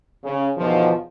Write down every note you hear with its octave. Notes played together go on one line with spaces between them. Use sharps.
C#3
E2 B2 D#3 F3